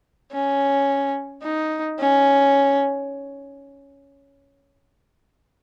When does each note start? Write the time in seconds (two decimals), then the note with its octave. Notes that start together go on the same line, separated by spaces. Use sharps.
0.32 C#4
1.43 D#4
2.00 C#4